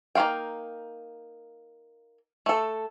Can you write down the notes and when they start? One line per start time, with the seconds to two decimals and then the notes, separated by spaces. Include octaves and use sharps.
0.15 A#3 D#4 F#4 F5 G5
2.46 A3 A4